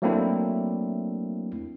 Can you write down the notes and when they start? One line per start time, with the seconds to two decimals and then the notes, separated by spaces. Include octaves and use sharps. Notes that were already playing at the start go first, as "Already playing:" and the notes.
0.02 F#3 A3 A#3 C4 D4 E4